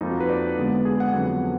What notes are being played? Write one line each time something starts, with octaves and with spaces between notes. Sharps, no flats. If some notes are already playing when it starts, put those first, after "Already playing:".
F2 F3 A#3 D#4
F#4
B4
D5
D3 G#3 B3
G#4
F#5
F2 D3 F#3 B3